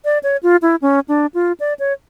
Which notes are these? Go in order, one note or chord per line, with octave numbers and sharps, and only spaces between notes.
D5
C#5
F4
E4
C#4
D4
F4
D5
C#5